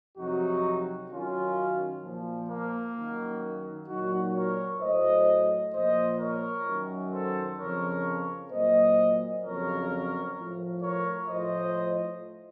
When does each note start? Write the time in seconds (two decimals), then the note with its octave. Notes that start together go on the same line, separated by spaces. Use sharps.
0.18 F2 C3 F#3 D#4 F#4
1.11 F#2 D#3 F#3 C#4 F4
2.03 A#2 F3
2.50 A#3
2.96 F#2 D#3 F#3
3.88 A#2 F#3 D#4 F#4
4.35 A#4 C#5
4.81 A2 F#3 C5 D#5
5.73 A#2 F3 C5 D#5
6.20 A#4 C#5
6.66 F#2 D#3 F#3
7.13 A4 C5
7.59 F2 C#3 F3 A#4 C#5
8.51 A#2 F#3 C5 D#5
9.44 F2 C#3 F#3 A#4 C#5
10.37 A2 F3
10.83 A#4 C#5
11.29 A2 F3 C5 D#5